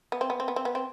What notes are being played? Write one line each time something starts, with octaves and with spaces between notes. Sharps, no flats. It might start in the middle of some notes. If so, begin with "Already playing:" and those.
B3
C4
B3
C4
B3
C4
B3
C4